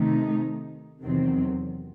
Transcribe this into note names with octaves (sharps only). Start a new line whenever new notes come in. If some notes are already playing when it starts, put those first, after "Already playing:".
Already playing: C3 D#3 A3 D#4
E2 C3 D#3 F#3 C4